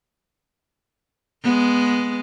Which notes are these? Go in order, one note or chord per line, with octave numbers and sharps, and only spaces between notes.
G#3 B3